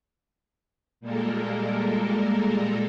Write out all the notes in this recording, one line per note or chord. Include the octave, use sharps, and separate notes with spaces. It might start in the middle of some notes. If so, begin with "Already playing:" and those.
A#2 G3 G#3 A#3 A4 A#4